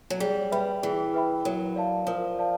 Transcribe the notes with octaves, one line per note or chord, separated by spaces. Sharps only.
F#3
G3 G#4
G3 B4 E5 G5 B5
E3 G#4
B4 E5 G5 B5
F#3 A#4
D5 F5 A5
F3 A#4
D5 F5 A5